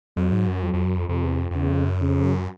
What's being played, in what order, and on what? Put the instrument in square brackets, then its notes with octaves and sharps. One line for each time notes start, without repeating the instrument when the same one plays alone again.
[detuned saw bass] F2 [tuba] F#3
[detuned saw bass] G#2
F#2
[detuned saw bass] F2 [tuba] F#3
[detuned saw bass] F2
F#2
F2
[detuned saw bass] F2 [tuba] C3
[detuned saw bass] E2
F2
F2
[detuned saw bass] E2 [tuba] C#3
[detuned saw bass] F2
F#2
[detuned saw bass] F2 [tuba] C#3
[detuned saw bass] F#2